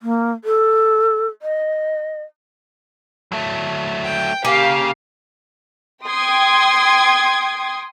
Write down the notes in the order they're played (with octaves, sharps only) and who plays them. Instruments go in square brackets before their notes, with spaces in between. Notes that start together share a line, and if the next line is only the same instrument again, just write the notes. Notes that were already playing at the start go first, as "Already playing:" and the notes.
[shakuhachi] A#3
A4
D#5
[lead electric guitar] F#3 A3
[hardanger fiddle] G5
[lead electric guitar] C#3 G#4 [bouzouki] A#3 [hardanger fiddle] G4 [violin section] F5
[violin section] G5 C6 D#6 G#6